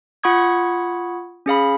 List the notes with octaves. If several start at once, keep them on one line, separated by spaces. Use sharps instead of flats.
F4 F#5 B5 C#6 D#6 G#6
C#4 G#4 F5 B5